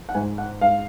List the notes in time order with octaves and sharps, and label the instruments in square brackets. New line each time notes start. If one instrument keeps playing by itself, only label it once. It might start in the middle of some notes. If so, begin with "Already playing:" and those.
Already playing: [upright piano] F3
F#5
G#2 G#5
F#5
G#2 F5